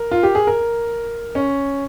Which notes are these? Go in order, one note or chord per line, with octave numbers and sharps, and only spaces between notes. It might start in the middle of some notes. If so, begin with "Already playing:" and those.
Already playing: A#4
F4
G4
G#4
A#4
C#4